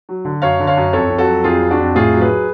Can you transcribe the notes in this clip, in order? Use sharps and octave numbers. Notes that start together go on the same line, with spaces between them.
F#3
D3
F#2 C#5 F5
D3
C#5 F5
F#2
F2 A4 C#5
F2
F#4 A4
F#3
F2 F4 G#4
F2
D4 F#4
F2
A2 F4 G#4
F#3
G#4 B4
F#3